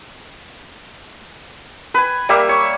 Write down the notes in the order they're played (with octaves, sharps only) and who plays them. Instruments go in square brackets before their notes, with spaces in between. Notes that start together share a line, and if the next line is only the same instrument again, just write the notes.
[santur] B4 G#5
G3 A#3 E5
C#5